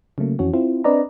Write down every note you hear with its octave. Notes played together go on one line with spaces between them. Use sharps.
C#3 F#3 A3 A#3
F2 E3 C#4 F#4
C4 E4 F4
C4 D4 B4 D5 D#5 A#5